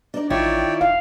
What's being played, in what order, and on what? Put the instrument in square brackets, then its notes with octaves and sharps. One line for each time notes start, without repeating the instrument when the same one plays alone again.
[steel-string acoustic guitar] D4 D#4 D5
[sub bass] A1 [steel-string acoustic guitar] D#3 E4 F4 [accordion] C#5 D5 G5
[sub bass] E1 [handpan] F5